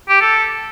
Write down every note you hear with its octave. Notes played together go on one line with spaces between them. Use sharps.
G4
A4